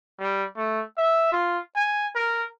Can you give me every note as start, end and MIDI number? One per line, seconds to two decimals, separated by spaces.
0.20 0.44 55
0.57 0.82 57
0.98 1.27 76
1.32 1.60 65
1.76 2.07 80
2.16 2.45 70